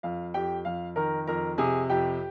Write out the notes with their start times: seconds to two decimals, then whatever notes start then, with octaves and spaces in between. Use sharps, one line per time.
0.03 F2 F5
0.34 F2 G4 G5
0.65 F2 F5
0.96 D#3 A#4 A#5
1.27 F2 A#4 A#5
1.58 C3 G#4 G#5
1.90 F2 G4 G5